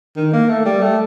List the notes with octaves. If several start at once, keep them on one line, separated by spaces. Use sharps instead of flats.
D#3
A#3
A3
G3
A3